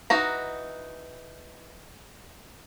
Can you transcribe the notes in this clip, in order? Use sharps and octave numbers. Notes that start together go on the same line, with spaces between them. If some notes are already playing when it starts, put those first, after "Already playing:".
E3 D#4 F#4 A#5